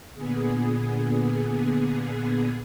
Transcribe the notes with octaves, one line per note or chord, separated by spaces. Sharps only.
A#2 D3 B3 G#4